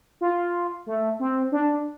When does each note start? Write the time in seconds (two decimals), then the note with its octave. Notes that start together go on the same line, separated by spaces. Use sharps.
0.21 F4
0.86 A3
1.20 C4
1.52 D4